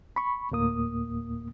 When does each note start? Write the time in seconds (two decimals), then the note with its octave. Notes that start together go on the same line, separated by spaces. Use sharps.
0.16 B5 C#6
0.51 D2 A2 A#3 D#6